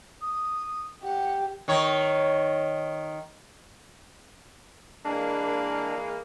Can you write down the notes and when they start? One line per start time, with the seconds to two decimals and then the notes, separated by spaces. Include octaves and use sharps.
0.22 D#6
1.04 G4 F#5
1.68 D#3 C#5
5.05 E3 G#3 A#3 D4